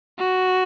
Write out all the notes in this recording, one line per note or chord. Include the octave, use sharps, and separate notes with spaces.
F#4